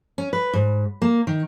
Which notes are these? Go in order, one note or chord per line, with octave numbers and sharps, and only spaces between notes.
C#4
B4
G#2
A#3
D#3